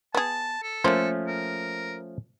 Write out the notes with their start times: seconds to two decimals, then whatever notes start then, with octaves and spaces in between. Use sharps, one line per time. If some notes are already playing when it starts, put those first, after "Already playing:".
0.15 B3 G#4 A5
0.63 A4
0.84 F3 A3 A#3 C#4 C5
1.27 A#4